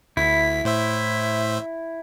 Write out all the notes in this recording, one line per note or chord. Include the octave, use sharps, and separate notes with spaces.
D2 E4 B6
A2 C5 E5